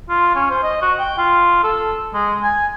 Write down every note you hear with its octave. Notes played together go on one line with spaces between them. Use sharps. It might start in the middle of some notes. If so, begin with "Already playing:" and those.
F4
C#4
C5
D#5
F#4
G5
F4
A4
G#3
G#5